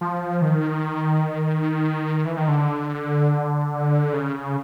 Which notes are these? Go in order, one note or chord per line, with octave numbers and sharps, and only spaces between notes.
F3
D#3
E3
D#3
D3
C#3